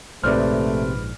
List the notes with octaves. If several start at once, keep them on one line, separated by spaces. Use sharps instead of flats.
A#1 G#2 C3 A3 B4 C5 D5 F6